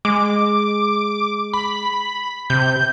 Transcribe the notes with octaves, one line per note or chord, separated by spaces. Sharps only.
G#3 D6
B5
C3 G6